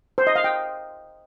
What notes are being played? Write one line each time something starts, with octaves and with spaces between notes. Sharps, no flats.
C5
D#5
F5
G5